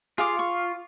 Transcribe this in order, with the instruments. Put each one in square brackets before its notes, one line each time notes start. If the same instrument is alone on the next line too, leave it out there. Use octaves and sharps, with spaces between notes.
[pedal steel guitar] F4 [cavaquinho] G#4 F5 D6
[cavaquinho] C#6